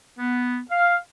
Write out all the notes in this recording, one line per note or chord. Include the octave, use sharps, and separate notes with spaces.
B3
F5